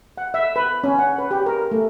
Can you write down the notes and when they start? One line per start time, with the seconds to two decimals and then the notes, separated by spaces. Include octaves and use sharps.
0.18 F#5
0.34 E5
0.56 B4
0.84 C#4
0.99 F#5
1.18 B4
1.31 G4
1.46 A#4
1.72 A3